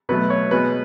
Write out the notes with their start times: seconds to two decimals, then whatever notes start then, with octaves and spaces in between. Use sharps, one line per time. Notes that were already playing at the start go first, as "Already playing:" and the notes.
0.09 B2 F#3 A3 B4
0.30 C#5
0.51 B2 G#3 B4